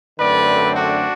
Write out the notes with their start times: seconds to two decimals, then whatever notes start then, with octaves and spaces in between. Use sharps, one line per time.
0.19 F#2 D3 A3 C4 B4 D5
0.76 D4 F#4